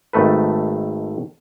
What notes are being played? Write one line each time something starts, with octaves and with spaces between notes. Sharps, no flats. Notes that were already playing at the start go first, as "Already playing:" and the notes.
G#1 D#3 A3 A4 B4